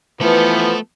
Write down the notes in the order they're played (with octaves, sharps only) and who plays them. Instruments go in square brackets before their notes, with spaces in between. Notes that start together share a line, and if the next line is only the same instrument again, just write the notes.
[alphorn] E3 [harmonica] F3 B3 [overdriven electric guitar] A3 A4